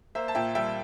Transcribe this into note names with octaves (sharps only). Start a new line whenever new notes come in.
A#3 C5 E5
A5
A#2 E5 G5
G3 E5 G5